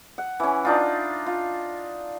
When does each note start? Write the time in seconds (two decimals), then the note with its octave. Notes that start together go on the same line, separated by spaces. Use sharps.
0.18 F#5
0.40 E3 C#4
0.65 D4 D#4 F4
1.26 F4